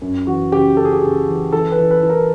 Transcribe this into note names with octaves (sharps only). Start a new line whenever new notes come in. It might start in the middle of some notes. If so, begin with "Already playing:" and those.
F#2
E3 F#4
C#3 G4
C#3 A4
G#4
G4
C#3 G#4
E3
E3 A4
B4
E3
B4
E3
A#4